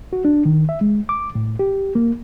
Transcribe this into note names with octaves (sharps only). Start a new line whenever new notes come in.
F#4
D4
D#3
E5
G#3
D6
A2
G4
A#3